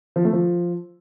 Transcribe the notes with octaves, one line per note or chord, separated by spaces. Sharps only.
F3
A3
F3